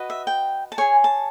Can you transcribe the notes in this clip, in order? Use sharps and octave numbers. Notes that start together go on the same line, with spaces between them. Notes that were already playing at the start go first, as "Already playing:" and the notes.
Already playing: F#4 B4 D#5
E5
G5
A5
G#4 C#5 G#5
A5